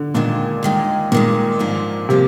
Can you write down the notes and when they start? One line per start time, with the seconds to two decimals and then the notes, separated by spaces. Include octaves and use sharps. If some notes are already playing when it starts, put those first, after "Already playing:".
Already playing: D3
0.14 D#2 A#2 D#3 G#3 D4
0.63 D#2 D#3 G#3
1.12 D#2 A#2 D#3 G#3
1.59 G#2 F3 A#3 D4
2.09 C3 F3 A#3 D4